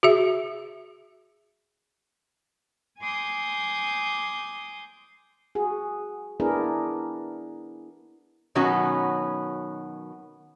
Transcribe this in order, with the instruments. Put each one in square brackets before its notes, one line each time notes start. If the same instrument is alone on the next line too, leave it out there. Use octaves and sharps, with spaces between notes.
[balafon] F#4 G#4 E5
[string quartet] G#5 C6 D6 D#6 G6
[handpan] F#4 G#4
B3 D4 E4 G#4 A#4
[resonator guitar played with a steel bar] B2 D#3 F#3 B3 C#4 F#4